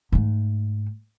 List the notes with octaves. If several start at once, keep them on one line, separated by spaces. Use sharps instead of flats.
G#2 A3